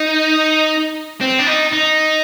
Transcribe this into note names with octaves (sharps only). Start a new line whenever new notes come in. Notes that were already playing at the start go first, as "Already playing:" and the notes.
Already playing: D#4
C4
D4
D#4
D#4